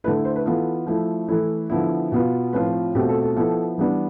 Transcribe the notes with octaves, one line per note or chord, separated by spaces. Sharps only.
D3 A3 E4 B4
C5
B4
E3 B3 F4 A4
F3 A3 E4
E3 A3 E4 A4
D3 F3 B3 E4
B2 B3 F4
A2 F3 C4 F4 B4
B2 A3 C4 F4 G4
A4
A4
F3 B3 E4 A4
E3 G3 B3 D4